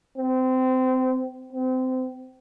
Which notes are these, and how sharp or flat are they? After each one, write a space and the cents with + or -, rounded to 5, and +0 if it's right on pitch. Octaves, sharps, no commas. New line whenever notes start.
C4 -25
C4 -25